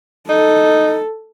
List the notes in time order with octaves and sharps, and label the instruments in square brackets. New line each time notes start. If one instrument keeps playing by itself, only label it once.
[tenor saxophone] D#4 [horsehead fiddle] A4